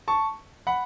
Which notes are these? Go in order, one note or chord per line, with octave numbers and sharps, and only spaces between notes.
A5 C#6
F#5 B5